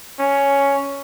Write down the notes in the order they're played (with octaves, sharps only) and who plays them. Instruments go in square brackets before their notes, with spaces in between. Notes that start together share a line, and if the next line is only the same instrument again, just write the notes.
[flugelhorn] C#4